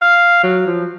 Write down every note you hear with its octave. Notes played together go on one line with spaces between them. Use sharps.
F5
F#3
F3